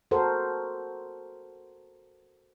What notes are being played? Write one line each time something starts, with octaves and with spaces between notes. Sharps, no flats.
F#4 A4 A#4 C5